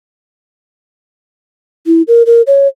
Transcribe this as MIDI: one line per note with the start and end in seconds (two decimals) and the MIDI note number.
1.87 2.02 64
2.08 2.23 70
2.26 2.42 70
2.47 2.67 73